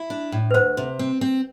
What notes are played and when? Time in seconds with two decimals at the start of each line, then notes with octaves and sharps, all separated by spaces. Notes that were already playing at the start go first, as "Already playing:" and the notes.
Already playing: E4
0.10 D4
0.32 A2
0.51 B4
0.54 D2 C5
0.77 C3
0.99 C4
1.21 C4